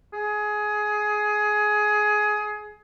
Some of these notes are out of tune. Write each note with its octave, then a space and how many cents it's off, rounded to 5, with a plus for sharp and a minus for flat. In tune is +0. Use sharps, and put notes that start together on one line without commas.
G#4 +20